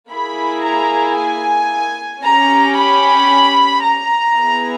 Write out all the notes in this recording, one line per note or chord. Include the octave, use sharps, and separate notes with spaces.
A#3 E4 G#4 B5
A#5
G#5
C#4 G4 A#5
B5
A#5
B3 E4 G#4